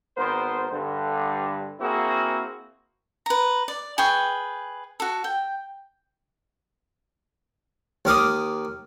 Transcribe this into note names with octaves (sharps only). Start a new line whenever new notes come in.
G#1 B3 A#4 C5
G2 D3
A#3 C4 E4 F#4 G#4
B4 A#5
D5
G#4 B4 G5 C#6
F#4 A4
G5
D#2 A#4 D6 D#6